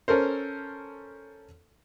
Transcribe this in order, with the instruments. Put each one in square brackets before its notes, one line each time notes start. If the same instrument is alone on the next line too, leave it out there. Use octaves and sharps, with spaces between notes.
[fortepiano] C#4 A4 A#4 C5